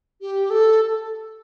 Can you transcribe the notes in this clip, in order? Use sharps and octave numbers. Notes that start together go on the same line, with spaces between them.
G4
A4